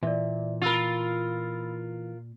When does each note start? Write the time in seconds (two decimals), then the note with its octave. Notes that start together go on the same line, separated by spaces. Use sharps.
0.03 A#2 E3 D5 E5
0.62 F4 A#4 B5 E6 A6